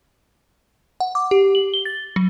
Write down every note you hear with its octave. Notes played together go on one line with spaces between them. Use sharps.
F#5
D6
G4
F#7
G7
A6
F#3